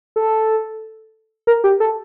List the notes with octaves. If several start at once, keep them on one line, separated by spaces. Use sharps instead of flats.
A4
A#4
G4
A4